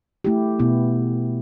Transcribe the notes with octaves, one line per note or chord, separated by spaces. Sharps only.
A3 E4 G4
B2 B3 E4